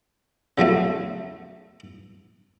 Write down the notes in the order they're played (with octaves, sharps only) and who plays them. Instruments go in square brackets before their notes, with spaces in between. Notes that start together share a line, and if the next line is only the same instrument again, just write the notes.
[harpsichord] C#3 F3 F#3 A3